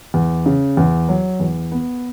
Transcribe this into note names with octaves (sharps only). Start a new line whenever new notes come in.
E2
C#3
E2
F#3
E2
B3